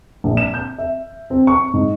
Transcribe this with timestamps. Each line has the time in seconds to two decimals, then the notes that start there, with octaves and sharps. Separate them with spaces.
0.24 A#1
0.37 E7
0.54 G6
0.78 E5
1.30 C4
1.47 C#6
1.73 G#2